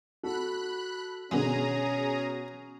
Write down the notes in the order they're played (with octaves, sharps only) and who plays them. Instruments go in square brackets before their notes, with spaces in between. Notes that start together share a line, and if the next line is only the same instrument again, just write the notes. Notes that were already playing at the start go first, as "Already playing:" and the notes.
[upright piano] F#4 A4 [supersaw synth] B5 F#6
[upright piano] B2 [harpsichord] D3 D#3 G#3 [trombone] C#4 [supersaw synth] G#4 A#5 D#6